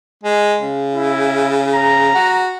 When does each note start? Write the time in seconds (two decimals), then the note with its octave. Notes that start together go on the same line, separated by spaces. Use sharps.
0.24 G#3
0.61 C#3
0.95 E4
1.74 A#5
2.15 F#4